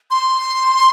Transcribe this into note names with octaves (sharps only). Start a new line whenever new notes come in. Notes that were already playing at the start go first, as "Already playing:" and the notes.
C6